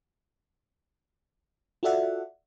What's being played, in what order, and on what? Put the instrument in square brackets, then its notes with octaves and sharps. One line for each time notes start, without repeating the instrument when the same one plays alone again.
[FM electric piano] F4 F#4 A4 D5 E5 F#5